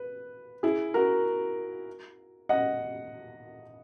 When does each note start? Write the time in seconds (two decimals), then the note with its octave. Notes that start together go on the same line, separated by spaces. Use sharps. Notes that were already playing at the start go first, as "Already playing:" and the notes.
Already playing: B4
0.63 E4 G#4
0.94 F#4 A#4
2.49 D#5 F#5